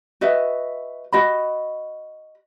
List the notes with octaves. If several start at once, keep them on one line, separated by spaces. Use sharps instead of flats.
F#4 B4 D#5 E5
F#4 D#5 B5